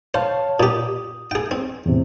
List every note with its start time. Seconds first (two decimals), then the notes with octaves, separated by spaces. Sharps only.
0.14 C5 C#5 F5 A5
0.60 A#2 G4 D#6
1.31 G#4 G5
1.51 C4
1.86 E2 A2 C3